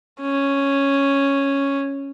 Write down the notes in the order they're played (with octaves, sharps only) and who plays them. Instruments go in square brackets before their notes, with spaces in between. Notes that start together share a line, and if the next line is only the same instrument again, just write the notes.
[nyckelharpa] C#4